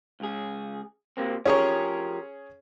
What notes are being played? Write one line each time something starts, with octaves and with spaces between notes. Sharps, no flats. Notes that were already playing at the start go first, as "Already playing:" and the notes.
C#2 G#4
C3 A#3 C4
F3 C#4 G4 G#4 A#4 C#5